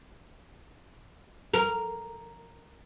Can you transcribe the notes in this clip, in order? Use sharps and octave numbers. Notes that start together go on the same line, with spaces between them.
A#4